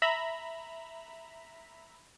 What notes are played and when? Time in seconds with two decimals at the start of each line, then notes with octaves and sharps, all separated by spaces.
0.02 E5 A#5 B5